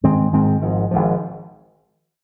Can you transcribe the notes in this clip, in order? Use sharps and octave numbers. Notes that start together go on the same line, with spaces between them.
G#2 D#3 G#3 C4
G#2 D#3 G#3 C4
G#1 G#2 F3
G#1 G#2 F3